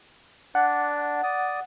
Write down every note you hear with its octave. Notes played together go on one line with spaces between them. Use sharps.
D4 D5 F#5
D5 D#6